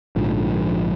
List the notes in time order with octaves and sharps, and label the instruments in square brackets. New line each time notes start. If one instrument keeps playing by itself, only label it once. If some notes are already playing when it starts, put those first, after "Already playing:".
[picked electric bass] A#1 G#2 D3 F3